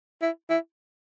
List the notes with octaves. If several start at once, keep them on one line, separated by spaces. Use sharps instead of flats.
E4
E4